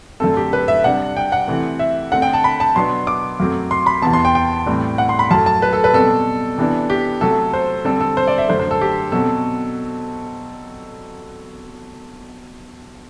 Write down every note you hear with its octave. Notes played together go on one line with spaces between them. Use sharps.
F#2 D3 A3 C4 A4
G4
B4
E5
C3 G3 D4 F#5
G5
F#5
C3 E3 A3 C4
E5
D3 A3 C4 F#5
G5
A5
B5
A5
B2 F#3 B3 D4 C6
D6
F#2 F#3 A3 C4
C6
B5
E2 C3 E3 B3 A5
C6
G5
G5
A2 E3 G3 C4
F#5
C6
B5
F#2 F#3 A3 A5
A5
B4
A4
B4
B2 G3 C4 A4
C3 E3 B3 D4
G4
C3 F#3 A3 A4
C5
D3 G3 C4 A4
A4
C5
D5
E5
F#2 D3 A3 C5
C5
A4
G4
B2 F#3 C4 A4